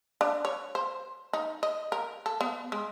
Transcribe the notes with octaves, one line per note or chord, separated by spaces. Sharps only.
D4
C#5
C5
D#4
D#5
A#4
A4
B3
G#3